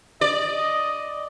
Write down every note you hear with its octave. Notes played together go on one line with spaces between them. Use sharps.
D5 D#5